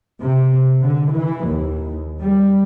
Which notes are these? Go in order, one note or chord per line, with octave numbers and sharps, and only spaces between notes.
C3
D3
E3
D#2
G3